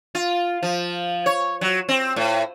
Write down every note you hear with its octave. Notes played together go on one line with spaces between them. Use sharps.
F4
F3
C#5
F#3
C4
A2